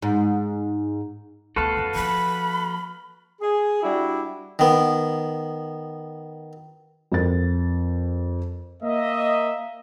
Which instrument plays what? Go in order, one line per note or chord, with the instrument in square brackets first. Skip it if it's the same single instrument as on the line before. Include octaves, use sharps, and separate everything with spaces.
[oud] G#2
[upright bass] D2 B3 [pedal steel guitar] F#4 B4 F5 [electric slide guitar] A4
[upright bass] F2 D3
[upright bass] F3 A#3 [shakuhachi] B5
[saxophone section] G#4
G3 D4 E4 F#4
[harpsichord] D#3 B3
[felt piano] F2 A#4 A6
[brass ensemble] A#3 D#5 E5